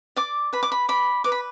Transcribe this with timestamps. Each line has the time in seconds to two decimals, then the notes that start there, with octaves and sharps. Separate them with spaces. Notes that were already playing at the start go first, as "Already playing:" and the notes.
0.16 D5 D6
0.53 B4 B5
0.63 D6
0.72 B5
0.89 D5 B5
1.24 B4 D6
1.32 B5